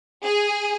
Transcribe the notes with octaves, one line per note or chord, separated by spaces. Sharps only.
G#4